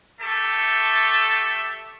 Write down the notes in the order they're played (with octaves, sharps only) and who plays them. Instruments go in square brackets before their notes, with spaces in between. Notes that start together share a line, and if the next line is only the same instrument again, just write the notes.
[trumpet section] A3 G4 A4 E5 A5